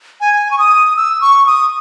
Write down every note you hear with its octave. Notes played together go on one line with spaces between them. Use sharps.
G#5
C#6
D#6
E6
C#6
D#6